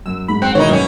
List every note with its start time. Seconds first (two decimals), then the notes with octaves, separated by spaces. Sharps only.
0.06 F#2 E6
0.28 G#2 B5
0.42 C4 F#5
0.55 B2 D#3 E3 D#4 C#5
0.69 F#2 B2 C#4